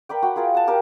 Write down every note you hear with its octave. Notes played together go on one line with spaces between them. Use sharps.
A#4 B4 D5 G5
F#4 F#5 G5
F4 G#4 A#4 D5
F#5 A5
G4 A#4 D5